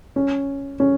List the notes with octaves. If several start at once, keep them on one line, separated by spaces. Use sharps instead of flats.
C#4
C#4